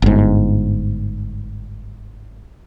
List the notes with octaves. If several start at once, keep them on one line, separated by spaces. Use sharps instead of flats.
G1 G#2